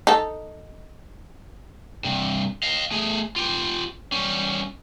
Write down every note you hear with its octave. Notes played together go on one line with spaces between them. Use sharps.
D#4 A4
G2 C3
D#5 F5
A3 G#4
F4 G4
G3 C#4